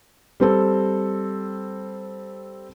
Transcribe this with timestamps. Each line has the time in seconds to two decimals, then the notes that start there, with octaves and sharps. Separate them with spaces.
0.40 G3 C4 A4